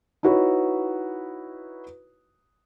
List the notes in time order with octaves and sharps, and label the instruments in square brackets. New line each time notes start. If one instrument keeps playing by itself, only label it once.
[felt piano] D#4 E4 F#4 B4 C#5